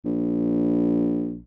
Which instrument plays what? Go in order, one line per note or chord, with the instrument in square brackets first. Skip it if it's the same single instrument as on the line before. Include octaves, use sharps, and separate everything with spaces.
[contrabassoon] A#1